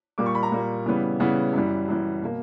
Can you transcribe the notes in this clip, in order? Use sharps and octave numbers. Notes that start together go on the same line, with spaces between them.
A#2 G3 A#3 D6
C#6
B5
A#5
A#2 G3 A#3
C#3 E3 G3 B3
C#3 E3 G3 B3 F#5
F#2 E3 G3
F#2 E3 G3
B2 A#3